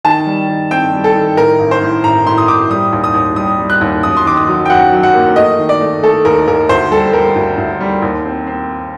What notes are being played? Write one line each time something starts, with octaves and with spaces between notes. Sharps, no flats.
D#3 A5
G3
D#3
C4 G5
G3
A4
D#3
A2 A#4
A1
C5
A2
A1 A#5
A2 C6
D#6
A2 D6
G3 D#6
D#2
D#6
D#2
G3 D#6
G3
F#6
D#2
F#2 D#6
C6
D#3 D6
D#6
F#3
G5
F#2 F#5
F#3
F#5
A#3
A3 D#5
D#3
D5
A3
A3 A4
D#2 A#4
D#2 A#4
D2 C5
G3 A4
G3 A#4
D2
D2
G3
D#2
C4
C4